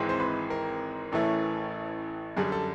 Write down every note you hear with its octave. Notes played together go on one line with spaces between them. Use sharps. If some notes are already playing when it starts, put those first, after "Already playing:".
Already playing: G#1 G#2 E3 G#3 C4
C5
B4
A#4
A1 A2 E3 A3 C#4
F#2 D3 G3 G#4
A4